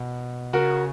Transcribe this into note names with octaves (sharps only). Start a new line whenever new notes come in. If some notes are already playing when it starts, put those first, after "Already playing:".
Already playing: B2
C#3 F#4 A#4